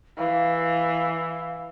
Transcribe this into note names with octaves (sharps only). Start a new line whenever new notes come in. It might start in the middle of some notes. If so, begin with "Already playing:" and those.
E3 F5